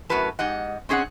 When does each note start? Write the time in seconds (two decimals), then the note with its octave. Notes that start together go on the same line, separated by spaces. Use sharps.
0.09 F#2 A2 F#4 A#4 B4 A5
0.39 G#2 G4 D#5 F#5
0.89 C4 C#4 G#4 D#5 F#5